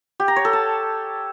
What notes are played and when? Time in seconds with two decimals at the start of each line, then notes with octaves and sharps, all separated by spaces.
0.20 G4
0.28 A#5
0.36 C#5
0.45 A4
0.53 A5